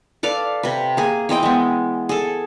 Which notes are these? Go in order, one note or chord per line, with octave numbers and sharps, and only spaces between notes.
A4 B4 D5 F5
C3 B4
A#3 G#4
E3 C4 D#5 G5
G#3 B3
G#4 A4